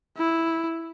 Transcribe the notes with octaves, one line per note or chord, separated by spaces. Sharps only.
E4